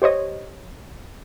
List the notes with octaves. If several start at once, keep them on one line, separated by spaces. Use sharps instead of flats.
G4 C5 C#5 D#5